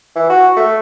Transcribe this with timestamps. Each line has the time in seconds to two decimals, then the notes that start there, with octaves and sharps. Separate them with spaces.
0.16 E3
0.30 F#4
0.56 A3